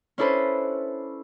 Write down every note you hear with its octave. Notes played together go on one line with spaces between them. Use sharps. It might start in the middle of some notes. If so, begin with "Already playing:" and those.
C#4 D4 E4 A4 B4 C5